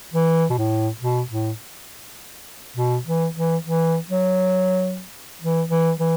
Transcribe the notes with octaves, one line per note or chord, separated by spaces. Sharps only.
E3
B2
A2
B2
A2
B2
E3
E3
E3
F#3
E3
E3
E3